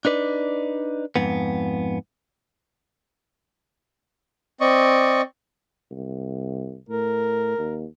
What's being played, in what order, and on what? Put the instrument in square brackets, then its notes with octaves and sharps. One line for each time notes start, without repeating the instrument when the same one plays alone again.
[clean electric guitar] D4 D#4 B4 D5
F2 G#2 B3
[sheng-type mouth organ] C4 D5 D#5 C#6
[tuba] C2
[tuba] A2 [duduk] A#4
[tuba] D#2